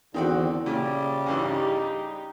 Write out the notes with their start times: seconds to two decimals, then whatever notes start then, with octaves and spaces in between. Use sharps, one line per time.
0.14 E2 D3 D#3 C4 F#4
0.66 A#2 C#3 G3
1.26 C#2 G2 E3 D#4 G4